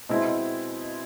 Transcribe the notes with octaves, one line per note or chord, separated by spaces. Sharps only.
B2 G#3 C4 E4